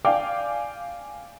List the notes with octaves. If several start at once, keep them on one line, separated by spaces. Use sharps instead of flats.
D5 F5 G5 G#5 D6